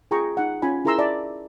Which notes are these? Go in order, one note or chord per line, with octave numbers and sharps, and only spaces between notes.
F4 G#4 G5 A#5 C#6
D#4 F#5
C#4 F4 G#5 B5
E4 G#4 A#4 A#5 C6 E6
D5 E5 A5